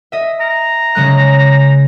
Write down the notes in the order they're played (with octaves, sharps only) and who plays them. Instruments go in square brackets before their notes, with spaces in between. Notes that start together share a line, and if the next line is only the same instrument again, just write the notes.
[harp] D#5 E5
[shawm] A#5
[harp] C#3 G#3 F#6